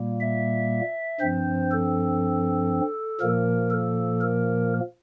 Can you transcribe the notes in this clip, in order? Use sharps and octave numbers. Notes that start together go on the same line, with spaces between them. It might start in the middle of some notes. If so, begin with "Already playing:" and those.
Already playing: A#2 G3 A#3
E5
G2 F3 C4 C5
A4
A#2 F3 A#3 A#4
A4
A#4